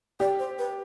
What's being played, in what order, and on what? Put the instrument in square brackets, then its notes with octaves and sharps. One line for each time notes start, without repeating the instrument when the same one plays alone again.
[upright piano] G4 [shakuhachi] D5
[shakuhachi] C5
B4